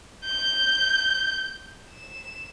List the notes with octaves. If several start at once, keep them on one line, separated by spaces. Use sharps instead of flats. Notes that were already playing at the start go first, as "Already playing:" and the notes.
G6
E7